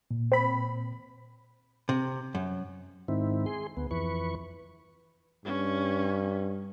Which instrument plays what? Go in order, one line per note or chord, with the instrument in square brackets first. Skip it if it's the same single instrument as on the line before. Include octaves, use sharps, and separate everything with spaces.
[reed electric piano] A#2
[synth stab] C4 B5
[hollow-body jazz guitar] C3
F#2
[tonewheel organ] G#2 D#3 C4 E4
G#4 C6
D2 B3
F2 E3 B4 C#6
[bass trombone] G2 [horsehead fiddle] C#4